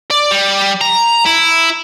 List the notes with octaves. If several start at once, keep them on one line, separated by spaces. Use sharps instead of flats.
D5
G3
A#5
E4